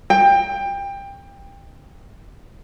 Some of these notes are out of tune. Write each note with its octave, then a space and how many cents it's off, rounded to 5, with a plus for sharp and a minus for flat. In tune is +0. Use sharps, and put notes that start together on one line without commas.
G5 +20